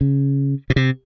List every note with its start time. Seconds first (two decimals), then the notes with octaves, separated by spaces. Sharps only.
0.01 C#3
0.70 B2
0.76 C3